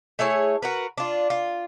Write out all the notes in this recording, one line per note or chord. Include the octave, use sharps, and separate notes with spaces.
A3 E4 G#4 C#5
F#4 A#4 B4
D4 F4
F4